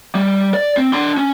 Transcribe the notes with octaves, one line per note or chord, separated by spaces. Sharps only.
G3
D5
C4
D4 C6
C#4